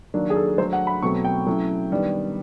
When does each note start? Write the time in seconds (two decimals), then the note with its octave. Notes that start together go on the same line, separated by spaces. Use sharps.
0.14 D#3 F#3 A#3 D4
0.30 G#4
0.36 A4
0.58 F#3 A3 D4 C5
0.73 F#5
0.87 B5
1.02 B2 F#3 A3 C4 C#6
1.25 G5
1.46 F#3 A3 C#4 E4
1.91 D#3 G3 B3 D4